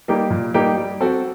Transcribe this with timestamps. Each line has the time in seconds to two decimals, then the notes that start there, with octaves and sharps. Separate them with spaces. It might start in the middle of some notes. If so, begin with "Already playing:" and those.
0.08 G3 A#3 D#4 G4
0.30 A#2
0.54 G3 A#3 D#4 G4
0.78 G3
1.00 C4 F#4 A4